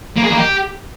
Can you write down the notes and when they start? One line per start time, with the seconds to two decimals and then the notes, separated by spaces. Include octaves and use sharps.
0.17 A#3
0.23 G#4
0.30 A#3
0.37 G4